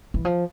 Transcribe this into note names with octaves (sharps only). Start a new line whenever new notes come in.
E3
F3